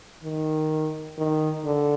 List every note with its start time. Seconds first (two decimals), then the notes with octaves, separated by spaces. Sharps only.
0.24 D#3
1.18 D#3
1.65 D3